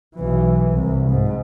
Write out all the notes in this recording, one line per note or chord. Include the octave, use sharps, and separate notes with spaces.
B1 E3
C2
G#2